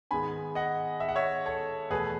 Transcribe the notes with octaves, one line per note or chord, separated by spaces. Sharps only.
G#2 D#3 G#3 B3 G#5 B5
D#5 F#5
E5
F#5
C#5 E5
A4 C#5
E2 B2 A3 G#4 B4